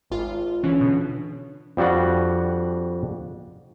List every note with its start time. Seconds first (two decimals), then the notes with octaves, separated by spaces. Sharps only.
0.10 G#1 F4
0.64 D3 E3 C#4
0.81 B2
1.77 F2 G3 D4 F#4 F#5